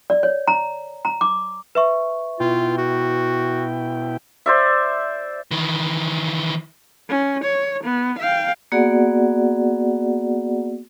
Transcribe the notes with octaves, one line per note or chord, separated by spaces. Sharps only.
D5
C#5
A#5
A#5
D6
B4 E5 C#6
B2 E4 F4 G5
F#4
C5 D5 E5
D#3 E3
C#4
C#5
B3
F5 G5
A#3 B3 F#4 G#4 D5 F#5